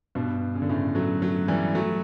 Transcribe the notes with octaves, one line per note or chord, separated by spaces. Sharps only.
G2 B2
C#3
D3
A2 C#3
F#3 A3
F#3 A3
E3 G3
F#3 A3